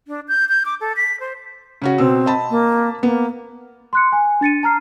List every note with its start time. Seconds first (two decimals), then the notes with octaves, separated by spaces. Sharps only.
0.08 D4
0.28 G6
0.49 G6
0.66 D6
0.81 A4
0.96 B6
1.20 C5
1.82 C#3 C#4 F#4
1.98 B2 C4 E6
2.26 D#5 A5 B5
2.50 A#3
3.03 A#3 B3
3.93 C6 F#6 C#7
4.12 G#5
4.41 D4 A6 C#7 D#7
4.63 A5 A#5 F6 C7